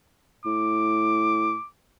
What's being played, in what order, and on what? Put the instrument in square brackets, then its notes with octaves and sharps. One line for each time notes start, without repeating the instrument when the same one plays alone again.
[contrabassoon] A2 [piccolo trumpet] D6